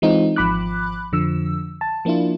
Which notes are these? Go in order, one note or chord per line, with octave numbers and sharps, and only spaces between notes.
E3 G#3 C4 D#4 F4
G#1 F3 B5 D6 F#6
F2 D3 F3 E6
A5
F3 A#3 D4 E4 F4